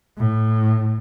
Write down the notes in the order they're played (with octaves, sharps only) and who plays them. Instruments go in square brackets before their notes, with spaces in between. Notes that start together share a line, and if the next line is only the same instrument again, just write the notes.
[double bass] A2